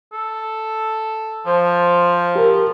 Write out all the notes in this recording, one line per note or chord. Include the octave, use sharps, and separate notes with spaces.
A4
F3 C5
G4 A#4